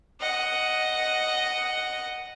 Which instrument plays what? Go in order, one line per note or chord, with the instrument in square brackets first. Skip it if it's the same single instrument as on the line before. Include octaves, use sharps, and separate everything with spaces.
[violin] D#5 F#5